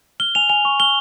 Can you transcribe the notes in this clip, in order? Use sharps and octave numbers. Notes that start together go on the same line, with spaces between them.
F6 G7
G#5 F7
G#5 F7
C#6
F6 G7